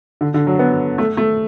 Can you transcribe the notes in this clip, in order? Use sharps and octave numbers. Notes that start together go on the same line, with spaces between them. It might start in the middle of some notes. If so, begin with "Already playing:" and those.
D3
D3
F#3
B3
A3
A3